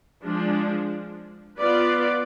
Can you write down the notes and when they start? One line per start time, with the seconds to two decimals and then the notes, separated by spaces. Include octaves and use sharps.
0.23 F3 G#3 D4
1.57 B3 F4 B4 D5